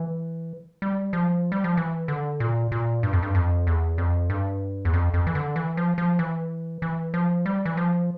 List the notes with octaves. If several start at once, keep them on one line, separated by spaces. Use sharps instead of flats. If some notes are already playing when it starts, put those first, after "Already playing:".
Already playing: E3
G3
F3
G3
F3
E3
D3
A#2
A#2
G2
F2
G2
F2
E2
F2
G2
E2
F2
F2
E3
D3
E3
F3
F3
E3
E3
F3
G3
E3
F3